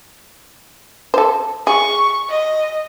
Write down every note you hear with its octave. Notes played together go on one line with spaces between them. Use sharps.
A4 C5
G#4 C#6
D#5